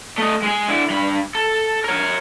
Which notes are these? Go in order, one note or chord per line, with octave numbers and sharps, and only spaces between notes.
A3 D#5
G#3 G#4
D3 E4
G2 B5
A4
A#4 C#5